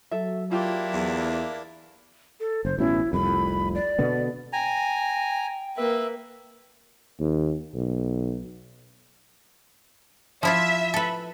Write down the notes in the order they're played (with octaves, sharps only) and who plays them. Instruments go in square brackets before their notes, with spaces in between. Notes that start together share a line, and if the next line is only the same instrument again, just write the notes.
[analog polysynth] F#3 [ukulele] A4 E5
[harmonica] A#3 D4 E4 [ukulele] F4 G4
[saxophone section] E2
[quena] A4
[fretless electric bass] F#1 [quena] C5
[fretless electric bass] A1 B2 C#4 [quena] E4
[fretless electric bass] F1 C2 F2 [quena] B5
[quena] D5
[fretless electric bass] B2 D3 B3
[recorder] G5 [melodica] G#5 A#5
[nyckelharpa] A#3 B4 [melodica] E5
[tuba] D#2
B1
[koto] F3 E4 F4 [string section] E5
[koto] A4 B4